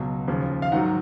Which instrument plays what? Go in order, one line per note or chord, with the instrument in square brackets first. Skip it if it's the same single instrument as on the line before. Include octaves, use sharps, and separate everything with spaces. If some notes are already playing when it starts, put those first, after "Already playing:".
Already playing: [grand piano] C#2 B2 F#3
D#2 C#3 F3
F5
G#2 D#3 F#3 F#5